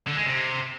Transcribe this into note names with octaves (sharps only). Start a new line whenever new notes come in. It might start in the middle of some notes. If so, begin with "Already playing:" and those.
D3
G#3
C3